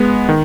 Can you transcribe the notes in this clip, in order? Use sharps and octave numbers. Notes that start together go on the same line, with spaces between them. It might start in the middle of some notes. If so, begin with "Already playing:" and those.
Already playing: G#3 B3
D#3